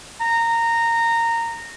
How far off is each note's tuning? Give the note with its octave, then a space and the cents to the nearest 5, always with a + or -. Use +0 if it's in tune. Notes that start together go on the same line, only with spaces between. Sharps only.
A#5 -15